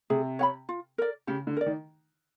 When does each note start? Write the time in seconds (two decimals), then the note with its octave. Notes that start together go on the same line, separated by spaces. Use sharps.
0.10 C3 G#4
0.39 C#5 F#5 B5
0.69 F4
0.98 A#4 D5
1.27 C#3 G4
1.47 D3
1.57 A#4 D5
1.66 D#3